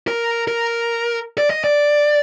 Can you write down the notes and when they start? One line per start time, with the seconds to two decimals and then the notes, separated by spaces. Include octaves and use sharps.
0.08 A#4
0.48 A#4
1.38 D5
1.50 D#5
1.64 D5